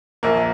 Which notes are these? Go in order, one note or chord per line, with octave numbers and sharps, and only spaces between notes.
A#1 A#3